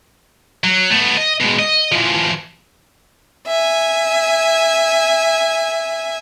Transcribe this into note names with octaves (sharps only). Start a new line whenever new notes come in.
F#3
A3 B3
D#5
B2 G#3
D#5
E3 F3
E5 G#5